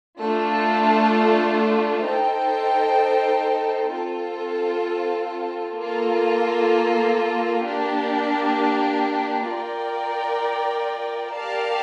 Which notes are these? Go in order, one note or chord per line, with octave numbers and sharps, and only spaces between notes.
A3 D4 F4 A4
D#4 A4 C5 G5
C4 F4 A4
A#3 F4 A4
A#3 D4 G4
F4 A#4 D5 G5
G4 A#4 D5 F5 A5